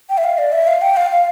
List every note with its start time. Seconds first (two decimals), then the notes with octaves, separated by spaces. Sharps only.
0.10 G5
0.17 E5
0.24 F5
0.38 D5
0.52 E5
0.67 F5
0.82 G5
0.97 F5
1.11 F5